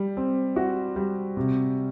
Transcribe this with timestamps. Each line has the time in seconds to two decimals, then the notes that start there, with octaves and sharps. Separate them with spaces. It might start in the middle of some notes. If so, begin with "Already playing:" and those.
Already playing: G3
0.17 C4
0.56 F#4
0.96 G3
1.37 C3